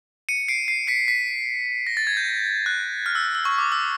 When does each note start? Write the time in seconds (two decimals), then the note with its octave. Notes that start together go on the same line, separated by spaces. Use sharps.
0.29 C#7 D#7
0.48 C7 D7
0.68 C7
0.87 B6 C#7
1.08 B6
1.87 A#6
1.97 A6
2.07 G#6
2.17 G6
2.66 F#6
3.06 F6
3.15 E6
3.35 E6
3.45 C#6
3.58 D6
3.72 E6